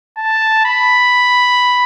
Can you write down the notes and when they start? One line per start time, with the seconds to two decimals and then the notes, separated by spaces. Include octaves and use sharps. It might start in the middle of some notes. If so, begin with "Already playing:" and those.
0.17 A5
0.65 B5